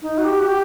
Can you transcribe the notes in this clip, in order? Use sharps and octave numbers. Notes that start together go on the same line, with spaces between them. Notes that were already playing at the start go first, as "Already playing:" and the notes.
D#4
F#4
G4
F#4
G4